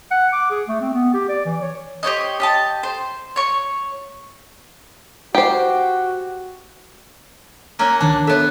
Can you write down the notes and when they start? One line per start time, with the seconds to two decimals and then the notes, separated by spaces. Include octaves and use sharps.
0.11 F#5
0.33 D6
0.51 G#4
0.68 A3
0.81 C4
0.94 B3
1.14 G4
1.29 D5
1.46 E3
1.62 C#5
2.03 G4 C5 C#5 D#5
2.40 G4 D#5 A5
2.83 C5
3.36 C#5 C#6
5.35 F#4 G4 C5
7.79 F#3 A#3 C#4
8.01 C#2 D#3 D4 A5
8.27 B3 A4 C#5 E5